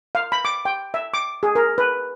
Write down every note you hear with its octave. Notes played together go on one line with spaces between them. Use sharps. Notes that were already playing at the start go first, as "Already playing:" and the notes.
F5
B5
D6
G5
E5
D6
G#4
A#4
B4